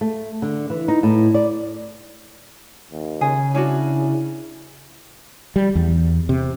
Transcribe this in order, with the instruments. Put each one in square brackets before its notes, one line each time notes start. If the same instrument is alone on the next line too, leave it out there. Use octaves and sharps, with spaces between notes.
[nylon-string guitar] A3
D3
E3
D#4
A2
D5
[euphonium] D#2
[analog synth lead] C#3 [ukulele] G#4
[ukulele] C#4 D4 F#4 [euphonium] E4
[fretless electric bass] G3
E2
C3